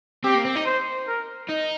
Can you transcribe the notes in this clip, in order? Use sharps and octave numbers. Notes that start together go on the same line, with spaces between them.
C4 G4
A#3
C4
D#4
C5
A#4
D#4